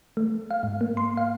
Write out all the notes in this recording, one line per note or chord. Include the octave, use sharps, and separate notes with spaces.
A3
F5
G#2
A#3
C6
F5